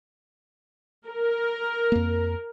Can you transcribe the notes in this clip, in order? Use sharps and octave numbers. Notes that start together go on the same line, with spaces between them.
A#4
F2 A#3